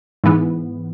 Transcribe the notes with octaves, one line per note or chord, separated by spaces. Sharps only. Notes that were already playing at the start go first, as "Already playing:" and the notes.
G#2 E3 B3